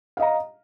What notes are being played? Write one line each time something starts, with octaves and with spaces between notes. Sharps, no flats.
D#5 F5 A#5